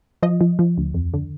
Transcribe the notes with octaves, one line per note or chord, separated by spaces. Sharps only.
F3 D#5
F3
F3
D2
F2
D3